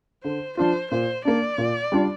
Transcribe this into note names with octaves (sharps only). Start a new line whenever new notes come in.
D3 C5
F3 D4 F4 C5
A#2 C5
A#3 D4 D5
A#2
G3 D4 F4